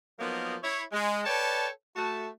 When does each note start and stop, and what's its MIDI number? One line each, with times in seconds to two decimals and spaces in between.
0.19 0.55 53
0.19 0.55 54
0.19 0.55 58
0.19 0.55 59
0.19 0.55 63
0.19 0.55 70
0.63 0.82 64
0.63 0.82 73
0.92 1.25 56
1.25 1.68 69
1.25 1.68 71
1.25 1.68 73
1.25 1.68 74
1.25 1.68 79
1.25 1.68 81
1.95 2.28 57
1.95 2.28 66
1.95 2.28 81